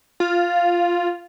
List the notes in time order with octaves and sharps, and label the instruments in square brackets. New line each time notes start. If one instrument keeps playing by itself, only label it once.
[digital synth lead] F4